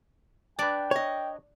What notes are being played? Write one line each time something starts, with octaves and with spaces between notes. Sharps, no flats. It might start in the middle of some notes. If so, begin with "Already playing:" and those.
D4 B4 D5 G5
C#5 D#5